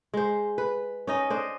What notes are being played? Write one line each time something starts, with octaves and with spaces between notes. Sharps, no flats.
G#3 C5
B4
C#4 D#4 D#5
D4 C5 D#5